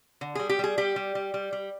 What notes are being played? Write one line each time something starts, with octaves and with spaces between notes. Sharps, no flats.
D3
G3 G#4
G4
G3 G#4
G3 G4
G3
G3
G3
G3